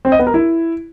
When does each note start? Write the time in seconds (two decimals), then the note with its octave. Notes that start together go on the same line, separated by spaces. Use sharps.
0.05 C4
0.12 D#5
0.19 B3
0.27 A#4
0.34 E4